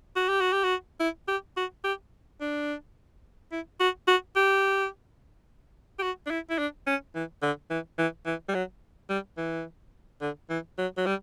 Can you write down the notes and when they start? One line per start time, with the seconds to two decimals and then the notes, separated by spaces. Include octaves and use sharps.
0.16 F#4
0.29 G4
0.41 F#4
0.53 G4
0.64 F#4
1.00 E4
1.28 G4
1.57 F#4
1.84 G4
2.41 D4
3.52 E4
3.80 F#4
4.08 F#4
4.36 G4
5.99 G4
6.03 F#4
6.27 D4
6.31 E4
6.50 E4
6.58 D4
6.87 C#4
7.15 E3
7.43 D3
7.70 E3
7.98 E3
8.26 E3
8.49 G3
8.55 F#3
9.10 G3
9.38 E3
10.21 D3
10.50 E3
10.78 F#3
10.97 F#3
11.06 G3